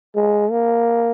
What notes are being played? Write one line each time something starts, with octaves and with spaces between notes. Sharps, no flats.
G#3
A#3